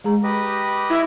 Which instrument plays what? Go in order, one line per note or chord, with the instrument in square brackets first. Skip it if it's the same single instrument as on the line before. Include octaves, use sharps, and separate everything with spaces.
[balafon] G#3 G#4 A#5
[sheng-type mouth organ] G4 B4 D#5
[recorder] E4